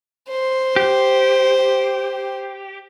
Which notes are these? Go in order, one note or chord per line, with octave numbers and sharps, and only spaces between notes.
C5
G4